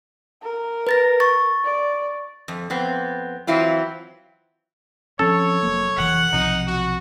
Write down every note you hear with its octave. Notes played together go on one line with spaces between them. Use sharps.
A#4
B4 A6 A#6
C#6 A6
D5
F2
F2 B3 C4
E3 F#3 C4 E4 F4
F3 C4 C#4 A4 C#5
F1 F#3 A#3
F1 E3 F#5
B1 C3 F3 D#4
F#4